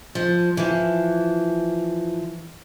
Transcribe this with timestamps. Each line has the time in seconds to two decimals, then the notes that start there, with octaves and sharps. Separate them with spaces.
0.15 F3
0.57 E3 F3